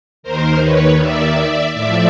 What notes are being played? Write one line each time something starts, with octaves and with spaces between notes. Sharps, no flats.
D#2 D#3 A#4 C5
B4 C#5
D5 E5
A2 F3 D5 E5